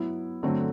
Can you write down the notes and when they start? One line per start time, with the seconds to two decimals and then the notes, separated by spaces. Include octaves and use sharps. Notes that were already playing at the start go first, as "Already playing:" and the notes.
Already playing: F#3 B3 E4
0.43 D3 F#3 A3 C4